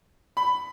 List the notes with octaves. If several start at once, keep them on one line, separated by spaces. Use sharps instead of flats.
B5